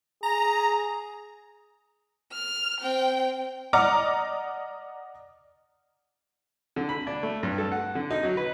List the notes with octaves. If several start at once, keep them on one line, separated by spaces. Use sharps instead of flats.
G#4 A#5
F6
C4 G5
D5 D#5 F#5 A#5 D6 F6
D3
B5
D4
A3
G2
A4
F#5
D3
D#4
F#3
B4